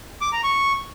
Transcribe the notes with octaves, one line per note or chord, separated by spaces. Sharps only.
D6
A#5
C#6